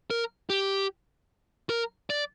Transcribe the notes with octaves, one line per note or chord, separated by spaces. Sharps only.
A#4
G4
A#4
D5